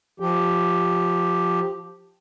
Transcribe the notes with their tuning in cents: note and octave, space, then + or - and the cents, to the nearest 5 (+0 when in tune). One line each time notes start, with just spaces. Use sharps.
F3 +10 G4 +0